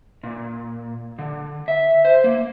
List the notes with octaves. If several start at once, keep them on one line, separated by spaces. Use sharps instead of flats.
A#2
D3
E5
C5
A#3